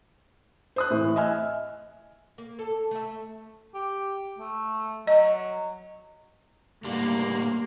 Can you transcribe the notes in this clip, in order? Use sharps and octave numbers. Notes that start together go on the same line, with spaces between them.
C5 D#6 F#6
A2 E3
D#5 E5 G#5 F6
A#3
A4
A3 E5
G4
A3
F#3 D#5
A2 D3 G3 A#3